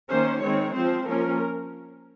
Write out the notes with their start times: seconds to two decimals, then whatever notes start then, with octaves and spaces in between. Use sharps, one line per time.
0.11 D#3 A#3 C#4 C5
0.43 D#3 G#3 C4 C#5
0.74 F3 C4 C5
1.07 F3 A#3 C#4 A#4